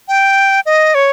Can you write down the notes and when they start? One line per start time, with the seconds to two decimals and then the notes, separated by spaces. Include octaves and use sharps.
0.08 G5
0.66 D#5
0.95 C#5